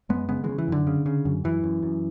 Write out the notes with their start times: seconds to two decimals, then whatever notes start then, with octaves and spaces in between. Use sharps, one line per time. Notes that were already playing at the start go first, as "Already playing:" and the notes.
0.09 F#2 G#3 B3
0.29 C#3 G#3 B3
0.44 E3 G#3
0.49 C#3
0.58 E3
0.68 F#2 D3
0.87 C#3
1.06 C#3
1.25 F#2
1.44 F#2 E3
1.64 F#2
1.83 F#2